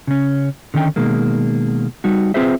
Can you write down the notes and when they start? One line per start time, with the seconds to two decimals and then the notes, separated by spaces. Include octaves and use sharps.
0.07 C#3 C#4
0.74 D3 D#3 C#4 D#4 G5
0.96 B2 D#3 G#3 A#3
2.04 G3 D#4 F#4
2.34 C4 F4 G#4 B4 C5 E5